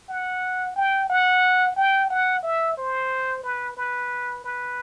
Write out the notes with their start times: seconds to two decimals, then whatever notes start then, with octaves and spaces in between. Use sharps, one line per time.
0.09 F#5
0.76 G5
1.09 F#5
1.76 G5
2.10 F#5
2.43 E5
2.77 C5
3.43 B4
3.77 B4
4.44 B4